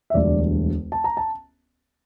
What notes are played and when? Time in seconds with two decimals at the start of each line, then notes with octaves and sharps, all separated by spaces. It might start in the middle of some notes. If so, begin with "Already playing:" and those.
0.10 E5
0.14 E1 D2 D3 G3 D5
0.92 A5
1.04 A#5
1.17 A5